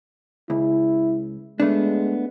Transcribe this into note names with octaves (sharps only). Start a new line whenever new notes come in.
C#2 E4
G#3 A3 B3 D4